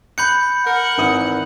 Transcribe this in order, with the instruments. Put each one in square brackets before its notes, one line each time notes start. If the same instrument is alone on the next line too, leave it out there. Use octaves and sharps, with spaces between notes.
[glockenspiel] B5 G6 C#7 [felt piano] F#6
[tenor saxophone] A#4 [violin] F#5
[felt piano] G#1 A#4 D#6 [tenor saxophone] E3